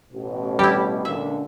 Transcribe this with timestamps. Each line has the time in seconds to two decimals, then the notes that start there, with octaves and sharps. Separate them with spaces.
0.13 A1 B2
0.59 G3 E4 G4
1.05 C#2 A#2 D3 E5